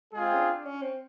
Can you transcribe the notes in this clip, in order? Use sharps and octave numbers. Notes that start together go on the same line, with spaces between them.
G#3 C4 F4 G#4
C#4
D4
C#4
C4